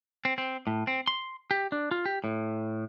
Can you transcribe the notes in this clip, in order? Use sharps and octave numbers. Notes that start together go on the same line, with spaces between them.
C4
C4
A2
C4
C6
G4
D4
F4
G4
A2